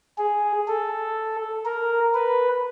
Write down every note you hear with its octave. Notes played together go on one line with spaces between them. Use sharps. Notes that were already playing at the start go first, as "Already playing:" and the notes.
G#4
A4
A#4
B4